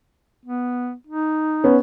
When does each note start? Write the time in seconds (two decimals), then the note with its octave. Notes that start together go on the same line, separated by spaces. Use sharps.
0.45 B3
1.07 D#4
1.64 B3 C#4